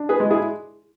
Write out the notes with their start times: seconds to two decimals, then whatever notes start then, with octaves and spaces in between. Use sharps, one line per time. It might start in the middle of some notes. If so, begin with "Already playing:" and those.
Already playing: D4
0.09 G#4 B4
0.20 G#3
0.31 E4 G#4